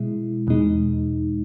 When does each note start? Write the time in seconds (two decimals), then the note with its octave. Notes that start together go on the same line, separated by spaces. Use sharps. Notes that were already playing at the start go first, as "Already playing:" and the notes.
Already playing: B2 G#3 E4
0.47 E2 B2 G#3 D#4